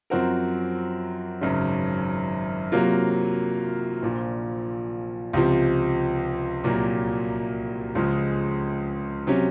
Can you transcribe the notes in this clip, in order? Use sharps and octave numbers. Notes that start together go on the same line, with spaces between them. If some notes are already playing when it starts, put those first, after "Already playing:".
F#2 F3 C4 F#4 A#4
G#1 F#2 C#3
C3 F#3 A#3 F4
A#1 A#2 F3
C#2 C3 F3
C2 A#2 F#3 A#3
C#2 C#3 F3 G#3
C3 F#3 C#4